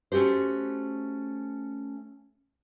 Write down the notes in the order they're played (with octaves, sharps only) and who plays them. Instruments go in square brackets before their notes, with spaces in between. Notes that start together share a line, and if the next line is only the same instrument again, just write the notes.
[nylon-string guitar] A3 C#4 F#4 G4 C5